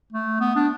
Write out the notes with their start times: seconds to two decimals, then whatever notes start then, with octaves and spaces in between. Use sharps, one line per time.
0.12 A3
0.40 B3
0.56 D4